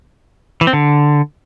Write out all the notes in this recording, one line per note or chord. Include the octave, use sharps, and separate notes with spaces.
E3
C4
D3